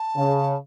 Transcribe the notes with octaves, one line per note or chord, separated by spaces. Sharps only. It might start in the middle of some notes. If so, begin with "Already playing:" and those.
Already playing: A5
C#3